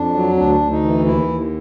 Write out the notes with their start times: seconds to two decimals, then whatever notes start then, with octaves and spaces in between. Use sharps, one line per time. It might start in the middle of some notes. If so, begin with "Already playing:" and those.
Already playing: F2 D4
0.15 F#3
0.37 D2 D4
0.60 D2
0.71 D#4
0.83 E3
1.06 D#2 E4
1.28 D#2